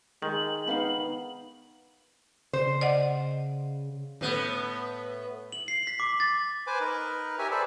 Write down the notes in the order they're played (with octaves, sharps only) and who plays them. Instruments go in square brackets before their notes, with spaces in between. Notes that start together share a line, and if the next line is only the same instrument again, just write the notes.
[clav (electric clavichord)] D#3 [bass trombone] G#3 [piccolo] F#7
[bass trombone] B3 [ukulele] D#4 F5 B5
[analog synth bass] C#3 [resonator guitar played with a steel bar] C5
[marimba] D5 D#5 F#5
[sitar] A2 B3
[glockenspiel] F#7
C7
B6
D6
A6
[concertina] B4 C5 G#5 D6
D#4 A#4 B4
G4 A#4 C#5 E5 G#5
G#4 A4 B4 C5 D5 E5